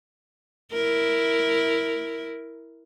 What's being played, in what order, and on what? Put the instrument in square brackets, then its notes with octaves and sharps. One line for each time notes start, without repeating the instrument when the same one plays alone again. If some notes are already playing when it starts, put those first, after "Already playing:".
[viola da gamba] E4 A#4